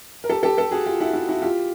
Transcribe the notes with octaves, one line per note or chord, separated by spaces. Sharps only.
A#4
G4 A4
G4 A4
G4 A4
F#4 G#4
F4 G4
E4 F#4
E4 F#4
E4 F#4
F4 G4